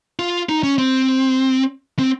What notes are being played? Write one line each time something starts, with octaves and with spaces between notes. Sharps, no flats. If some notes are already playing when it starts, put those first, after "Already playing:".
F4
D#4
C#4
C4
C4